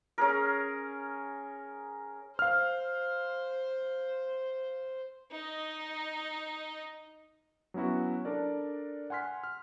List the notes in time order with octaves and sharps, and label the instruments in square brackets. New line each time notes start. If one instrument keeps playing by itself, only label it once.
[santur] C#4 G#4 A#4
[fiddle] C5 [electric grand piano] F5 F6
[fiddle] D#4 D#5
[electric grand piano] F#3 B3 C#4 E4 F#4
D4 A4 A#4 D5
F#5 G#5 C6 F6 B6
F6